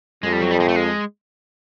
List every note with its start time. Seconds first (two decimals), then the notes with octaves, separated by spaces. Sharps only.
0.23 F2 G#3
0.33 G3
0.41 F#3
0.51 G3
0.60 G#3
0.68 A3
0.76 G#3